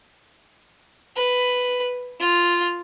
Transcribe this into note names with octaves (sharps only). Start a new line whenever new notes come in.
B4
F4